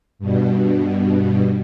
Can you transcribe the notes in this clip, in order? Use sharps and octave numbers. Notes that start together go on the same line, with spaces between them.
G2 B2